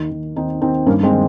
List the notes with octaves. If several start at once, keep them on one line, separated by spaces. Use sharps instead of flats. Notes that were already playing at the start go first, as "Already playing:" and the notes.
Already playing: D#2 D#3
D#2
D#2 C4 D#4
D#2 C4 D#4
G2 A#3 C#4
G#3 C4
D#3